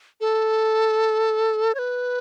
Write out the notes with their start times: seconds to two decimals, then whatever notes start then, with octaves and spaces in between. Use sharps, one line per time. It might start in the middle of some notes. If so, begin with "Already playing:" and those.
0.21 A4
1.75 C#5
1.79 B4